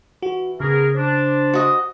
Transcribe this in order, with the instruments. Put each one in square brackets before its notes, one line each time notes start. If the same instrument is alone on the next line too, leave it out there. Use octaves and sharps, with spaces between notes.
[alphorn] E3 [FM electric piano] F#4
[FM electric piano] C#3 [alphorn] B3 [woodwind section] G#4 A#4
[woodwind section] D4 [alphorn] C5
[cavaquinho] F#4 D#5